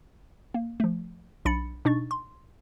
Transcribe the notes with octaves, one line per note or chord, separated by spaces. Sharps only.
A#3
F3 A3
B1 D4 B5 A6 C#7
B2 D4 D#4 C#6 A6
C6